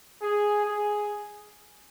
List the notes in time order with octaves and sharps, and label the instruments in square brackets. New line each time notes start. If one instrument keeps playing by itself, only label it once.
[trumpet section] G#4
G#4